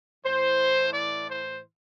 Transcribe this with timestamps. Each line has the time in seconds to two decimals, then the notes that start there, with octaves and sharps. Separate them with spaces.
0.24 A2 E3 C5
0.93 D5
1.29 C5